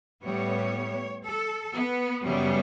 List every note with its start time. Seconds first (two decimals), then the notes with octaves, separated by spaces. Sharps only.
0.22 A2 G3 B3 C#5
1.23 A4
1.73 B3
2.23 F#2 C#3 G3 B3